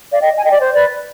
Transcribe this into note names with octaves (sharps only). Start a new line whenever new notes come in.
D5 F5
D#5 G5
G#5
D#5 G5
D5
C5
B4 D5